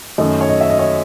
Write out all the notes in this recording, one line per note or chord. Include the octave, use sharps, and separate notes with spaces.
F#2 D#3 A3 C#4 D#5
C#5
D#5
E5
D#5
C#5